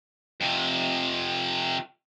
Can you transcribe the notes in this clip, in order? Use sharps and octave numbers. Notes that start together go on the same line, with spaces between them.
F2 C3